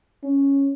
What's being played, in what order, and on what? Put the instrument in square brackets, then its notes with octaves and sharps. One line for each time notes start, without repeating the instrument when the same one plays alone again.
[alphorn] C#4